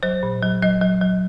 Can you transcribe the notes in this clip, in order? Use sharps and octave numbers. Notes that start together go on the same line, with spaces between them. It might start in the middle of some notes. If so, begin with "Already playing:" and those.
F#3 C5
A#2
F#3
F#3 D#5
F#3
F#3